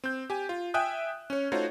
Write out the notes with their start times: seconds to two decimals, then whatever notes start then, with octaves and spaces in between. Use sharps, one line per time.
0.04 C4 G6
0.30 G4 G#5
0.49 F4
0.74 E5 G5 G#5 D#6 F#6
1.30 C#4 C#5
1.52 A3 D#4 F4 F#4 C5 C#5